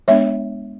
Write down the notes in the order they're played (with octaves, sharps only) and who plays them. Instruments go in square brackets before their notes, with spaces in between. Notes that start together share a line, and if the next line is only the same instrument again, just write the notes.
[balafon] G#3 B3 D4 C#5 E5